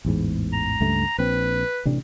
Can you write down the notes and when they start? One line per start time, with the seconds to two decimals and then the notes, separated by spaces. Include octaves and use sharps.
0.05 A1 E2 G#2
0.53 A#5
0.81 C#2 G2 A3
1.18 A#1 C4 B4
1.85 A1 C3 D4